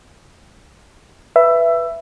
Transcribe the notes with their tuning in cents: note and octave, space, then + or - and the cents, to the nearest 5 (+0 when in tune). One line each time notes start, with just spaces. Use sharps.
B4 +0 E5 +15